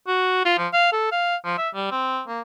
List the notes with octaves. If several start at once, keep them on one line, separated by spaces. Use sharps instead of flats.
F#4
F4
F3
F5
A4
F5
F3
E5
G3
C4
A#3